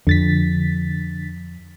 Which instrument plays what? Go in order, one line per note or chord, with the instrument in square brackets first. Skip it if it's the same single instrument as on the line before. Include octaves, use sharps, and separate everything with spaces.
[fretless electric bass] F2 [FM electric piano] D3 A6 B6